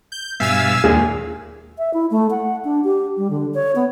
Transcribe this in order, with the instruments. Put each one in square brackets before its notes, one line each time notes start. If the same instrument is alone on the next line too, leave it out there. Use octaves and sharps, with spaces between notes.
[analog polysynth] G6
[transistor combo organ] G2 B2 E5 [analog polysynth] F5 G#5 E6
[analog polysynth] D#2 A#2 D#3 [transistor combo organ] G#3 [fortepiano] G#4
[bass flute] E5
E4
A3
F#5
D4
G4
G3
D3
C#5
B3